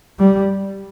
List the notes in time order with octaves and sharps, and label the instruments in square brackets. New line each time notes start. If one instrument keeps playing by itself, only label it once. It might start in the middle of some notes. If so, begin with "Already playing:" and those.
[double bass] G3